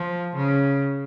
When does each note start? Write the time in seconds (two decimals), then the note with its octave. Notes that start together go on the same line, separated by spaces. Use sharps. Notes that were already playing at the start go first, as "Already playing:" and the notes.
Already playing: F3
0.36 C#3